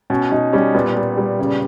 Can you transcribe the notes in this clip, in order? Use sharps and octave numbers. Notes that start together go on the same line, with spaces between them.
B2 C#4
B2 D#4
G3 C#4
A#2 B3
A#2
G3
C#3